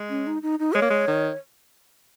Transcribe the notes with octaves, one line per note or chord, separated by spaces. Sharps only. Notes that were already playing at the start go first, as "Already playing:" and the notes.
Already playing: G#3
C#4
D#4
D#4
D#4
G#3 C#5
A#3
G#3
D#3